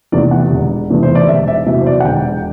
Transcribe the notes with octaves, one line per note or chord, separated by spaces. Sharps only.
E2 C3 E3 A3 D5
F#5
E1
E2 C3 E3 A3
C5
D5
E1 E5
E5
E2 C3 F#3 E5
C5
D5
F#5
E1 G5